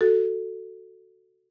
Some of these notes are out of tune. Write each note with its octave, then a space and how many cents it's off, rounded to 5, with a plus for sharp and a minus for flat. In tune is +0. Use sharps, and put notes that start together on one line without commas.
F#4 +0 A4 +5